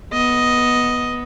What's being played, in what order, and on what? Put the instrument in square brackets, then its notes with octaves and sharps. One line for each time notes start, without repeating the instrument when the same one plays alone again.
[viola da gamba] B3 [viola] D#5